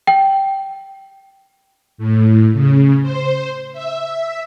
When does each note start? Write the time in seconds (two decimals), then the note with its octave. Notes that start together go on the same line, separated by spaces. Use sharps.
0.07 G5
1.98 A2
2.53 C#3
3.02 C5
3.73 E5